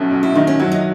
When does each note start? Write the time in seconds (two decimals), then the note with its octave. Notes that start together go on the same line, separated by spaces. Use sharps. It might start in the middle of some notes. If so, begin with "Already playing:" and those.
Already playing: B1 B2 A3 C#4
0.11 B1
0.23 E4
0.35 D#3 D#4
0.47 C#4
0.60 F#3 E4
0.72 D#4